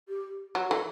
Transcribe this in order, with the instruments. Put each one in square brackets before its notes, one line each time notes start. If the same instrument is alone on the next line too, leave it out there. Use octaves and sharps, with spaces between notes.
[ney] G4
[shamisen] F#3 [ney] F#4
[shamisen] E3 [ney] A4